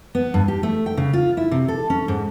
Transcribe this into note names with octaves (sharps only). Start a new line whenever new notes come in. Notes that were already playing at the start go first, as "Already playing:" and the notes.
B3
G2
G4
A3
G5
C#3
F4
E4
C3
A4
C#4
G#2